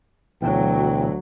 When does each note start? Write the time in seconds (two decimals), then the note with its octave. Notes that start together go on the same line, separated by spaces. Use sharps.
0.42 D2 B2 E3 F#3 G5